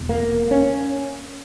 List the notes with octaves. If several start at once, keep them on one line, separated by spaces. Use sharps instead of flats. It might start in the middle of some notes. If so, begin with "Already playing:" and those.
Already playing: E1 E2 C3
A#3
C#4